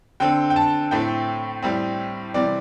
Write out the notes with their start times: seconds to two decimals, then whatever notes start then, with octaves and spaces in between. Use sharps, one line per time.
0.20 D3 C4 G5
0.50 G5
0.56 A5
0.91 A2 A3 C4 G5
1.62 A2 G3 C4
2.34 C3 E3 G3 C4 D5